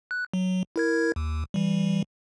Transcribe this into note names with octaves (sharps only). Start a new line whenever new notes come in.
F#6
F#3
E4 A#4 G#6
D#2
E3 G3